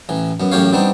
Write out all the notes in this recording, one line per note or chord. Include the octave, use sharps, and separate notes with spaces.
A1 E3
F#2 B3
A1 F#2 A2 G4 C#5 F5
G3 B3 C4 D4 D#4